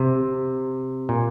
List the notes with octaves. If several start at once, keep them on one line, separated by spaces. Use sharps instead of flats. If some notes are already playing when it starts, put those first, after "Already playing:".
Already playing: C3
A#2